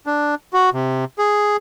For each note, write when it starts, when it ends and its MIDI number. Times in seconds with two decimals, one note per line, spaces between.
0.06 0.35 62
0.53 0.70 66
0.74 1.05 48
1.18 1.57 68